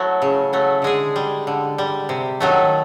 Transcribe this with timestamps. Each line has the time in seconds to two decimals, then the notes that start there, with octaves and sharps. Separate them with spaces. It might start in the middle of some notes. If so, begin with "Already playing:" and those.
Already playing: F#3 A3 E4
0.22 C#3
0.53 F#3 A3
0.82 D3 G#3 G#4
1.16 G3
1.47 D3
1.78 G3
2.09 C3
2.41 D#3 F#3 A3